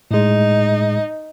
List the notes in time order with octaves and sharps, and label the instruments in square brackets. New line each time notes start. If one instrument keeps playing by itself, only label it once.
[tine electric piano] A2 G#3 [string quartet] D#4